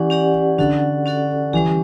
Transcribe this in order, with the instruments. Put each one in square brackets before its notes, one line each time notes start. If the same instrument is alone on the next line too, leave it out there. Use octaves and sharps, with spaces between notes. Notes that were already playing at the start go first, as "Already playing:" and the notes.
Already playing: [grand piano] E3 [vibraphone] C#4 G4 D5 F#5
[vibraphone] C#4 G4 D5 F#5
[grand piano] D3 [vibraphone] C#4 F#4 A4 D5 F#5
[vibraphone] C#4 F#4 A4 D5 F#5
[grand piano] E3 [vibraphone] G3 C#4 G4